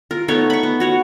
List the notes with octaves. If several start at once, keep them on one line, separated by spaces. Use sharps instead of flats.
F4 A#4
A3 B3 D#4 C#5
B5 C#6
B3
F#4 C#5 F#5